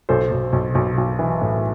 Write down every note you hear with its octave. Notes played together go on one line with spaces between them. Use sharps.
B1 A4 C5
B1
B1
B1
B1
E3
A2